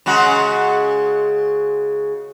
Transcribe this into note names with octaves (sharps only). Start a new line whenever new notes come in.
C#3 G#3 F#4